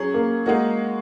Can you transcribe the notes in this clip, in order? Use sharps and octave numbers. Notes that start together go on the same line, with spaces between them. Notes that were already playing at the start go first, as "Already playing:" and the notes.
Already playing: F#3 C#4 G#4
A#3
G#3 A#3 D#4 F#4